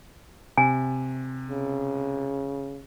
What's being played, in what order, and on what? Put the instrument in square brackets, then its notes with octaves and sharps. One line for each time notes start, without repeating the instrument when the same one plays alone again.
[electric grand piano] C3 [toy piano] G#5
[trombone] C#3